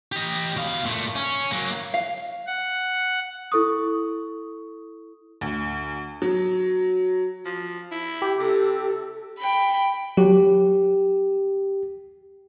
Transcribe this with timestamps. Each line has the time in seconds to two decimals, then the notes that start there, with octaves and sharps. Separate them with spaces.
0.12 G4 D#5
0.57 B2 F5
0.85 A#2 A3
1.16 C#4
1.51 F#3 A#3
1.94 F5
2.47 F#5
3.52 E4 A4 C#6 D#6
5.41 D2
6.22 F#3
7.45 F3
7.92 E4
8.22 G4
8.39 C3 A4
9.38 G5 B5
10.17 F#3 G4